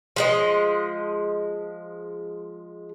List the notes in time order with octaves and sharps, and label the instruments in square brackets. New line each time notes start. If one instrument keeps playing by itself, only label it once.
[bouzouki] F3 G#3 D#5